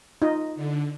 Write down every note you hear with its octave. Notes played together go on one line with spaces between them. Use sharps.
D#4 F4 D#5
D3